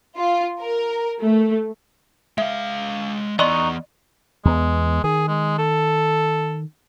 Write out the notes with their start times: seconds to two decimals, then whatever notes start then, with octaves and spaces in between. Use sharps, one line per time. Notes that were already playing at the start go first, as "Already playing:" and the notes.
0.17 F4
0.60 A#4
1.22 A3
2.38 G#3 E5 F5
3.39 E3 B3 D#4 D5 D#5 C6 C#6 F#6
4.45 E2 G#3 B3
5.04 D#3 G#4
5.29 G#3
5.58 A4